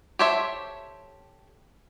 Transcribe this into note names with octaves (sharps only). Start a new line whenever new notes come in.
G4 A4 C5 C#5 E5